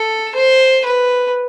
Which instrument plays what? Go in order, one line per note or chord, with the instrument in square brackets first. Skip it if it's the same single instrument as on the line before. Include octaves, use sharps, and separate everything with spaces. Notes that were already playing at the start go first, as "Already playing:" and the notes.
Already playing: [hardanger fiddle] A4
C5
B4